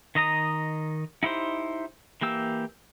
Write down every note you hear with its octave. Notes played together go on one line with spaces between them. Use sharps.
D#3 D#5 A#5 D#6
D#4 E4 G4 C5
E3 A#3 G4 E6